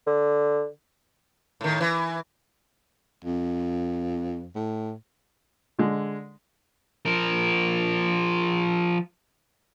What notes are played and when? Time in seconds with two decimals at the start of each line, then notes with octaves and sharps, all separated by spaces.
0.07 D3
1.61 A2 D#3
1.80 E3
3.24 F2
4.55 A2
5.79 D3 G#3
7.06 F3 A#4